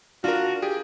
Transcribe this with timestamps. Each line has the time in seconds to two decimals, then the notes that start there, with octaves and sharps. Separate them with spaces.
0.24 D4 F4 F#4 A#4
0.62 G4 G#4